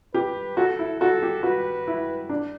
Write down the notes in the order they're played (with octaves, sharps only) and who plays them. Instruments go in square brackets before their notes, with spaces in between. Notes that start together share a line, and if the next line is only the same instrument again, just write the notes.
[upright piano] G4 [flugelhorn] B4
[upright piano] F#4 [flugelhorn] A4
[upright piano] E4
[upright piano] F#4 [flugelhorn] A4
[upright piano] G4
[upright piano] F#4 [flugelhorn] B4
[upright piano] E4
D4